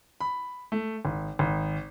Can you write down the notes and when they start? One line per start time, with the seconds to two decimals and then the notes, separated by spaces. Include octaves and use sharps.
0.21 B5
0.72 A3
1.05 G#1
1.39 G#1